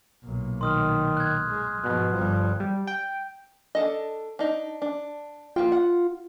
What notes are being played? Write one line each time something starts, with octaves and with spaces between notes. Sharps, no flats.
B1 A#2
D#3 C6 D#6 F6
F#6 G#6
G#3
G#2 B2 F3 F#6
G1 F3 G3
G3
G5
D4 A4 D#5
D4 D#4
D4
F3 A#3 F4 G5
F#5